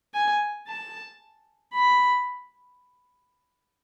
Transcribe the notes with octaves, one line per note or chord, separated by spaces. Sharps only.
G#5
A5
B5